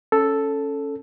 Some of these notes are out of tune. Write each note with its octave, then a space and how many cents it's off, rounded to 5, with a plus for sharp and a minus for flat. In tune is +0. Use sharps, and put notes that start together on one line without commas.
C#4 +0 A4 +0